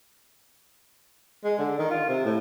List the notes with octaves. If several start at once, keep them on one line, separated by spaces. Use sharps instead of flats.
G#3
D3
D#3
F4
C3
A2